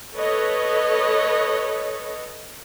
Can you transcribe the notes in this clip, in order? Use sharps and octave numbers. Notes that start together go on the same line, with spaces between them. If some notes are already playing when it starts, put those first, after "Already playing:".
A4 B4 C#5 D#5